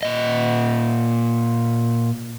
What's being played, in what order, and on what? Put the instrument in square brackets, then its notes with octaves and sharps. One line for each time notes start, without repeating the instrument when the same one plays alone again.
[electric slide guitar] A#2 D#5